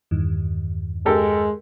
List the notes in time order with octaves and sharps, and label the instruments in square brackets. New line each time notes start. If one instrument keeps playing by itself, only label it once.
[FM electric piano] E2 G2 D#3
[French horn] G#3 [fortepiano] G4 A4 A#4